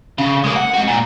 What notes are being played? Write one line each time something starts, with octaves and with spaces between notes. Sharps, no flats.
C#3
G#3 A#3
F#5
G#2 F#4
A#2